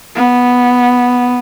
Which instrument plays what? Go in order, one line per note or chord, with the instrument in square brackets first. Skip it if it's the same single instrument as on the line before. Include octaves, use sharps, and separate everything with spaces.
[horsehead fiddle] B3